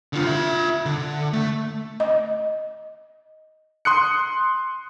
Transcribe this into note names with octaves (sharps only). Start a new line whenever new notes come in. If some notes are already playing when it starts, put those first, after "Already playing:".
D3 F4
F4 E5
D3
A3
D#5
C6 D#6 F#6 C#7